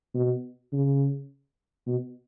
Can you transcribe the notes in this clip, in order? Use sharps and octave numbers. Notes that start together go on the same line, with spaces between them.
B2
C#3
B2